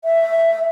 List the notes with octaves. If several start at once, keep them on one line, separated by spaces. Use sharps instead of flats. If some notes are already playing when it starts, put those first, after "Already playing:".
E5